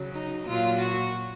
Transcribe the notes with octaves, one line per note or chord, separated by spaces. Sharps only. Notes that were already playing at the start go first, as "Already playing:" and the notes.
Already playing: C#3 F#3
D#4
A#2 F#3 F4
F#4